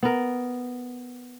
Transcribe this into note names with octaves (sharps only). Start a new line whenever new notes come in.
B3 A#4